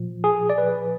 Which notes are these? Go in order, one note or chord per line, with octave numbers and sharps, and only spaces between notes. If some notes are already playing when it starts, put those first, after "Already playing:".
Already playing: A#2 F3
G#4
D5
B4